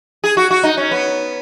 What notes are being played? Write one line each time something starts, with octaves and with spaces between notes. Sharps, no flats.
G#4
F#4
F#4
D#4
C#4
B3